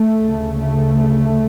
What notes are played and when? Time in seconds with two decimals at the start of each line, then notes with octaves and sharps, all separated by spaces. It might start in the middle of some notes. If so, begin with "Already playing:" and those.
Already playing: A3
0.23 D2 C#3
0.58 A3